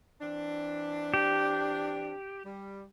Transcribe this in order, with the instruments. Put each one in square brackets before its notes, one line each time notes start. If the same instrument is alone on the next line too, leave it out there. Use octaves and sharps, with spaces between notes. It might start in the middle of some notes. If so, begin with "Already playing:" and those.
[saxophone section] E3 C4 D4
[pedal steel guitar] G4
[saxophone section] G3